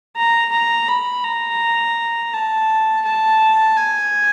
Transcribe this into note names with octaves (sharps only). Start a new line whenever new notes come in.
A#5
A#5
B5
A#5
A5
A5
G#5